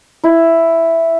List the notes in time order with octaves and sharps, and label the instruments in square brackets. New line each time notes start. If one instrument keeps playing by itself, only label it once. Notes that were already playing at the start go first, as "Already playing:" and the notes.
[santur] E4